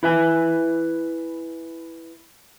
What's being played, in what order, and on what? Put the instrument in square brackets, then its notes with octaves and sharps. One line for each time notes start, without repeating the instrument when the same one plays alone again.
[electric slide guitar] E4 B4 E5 G#5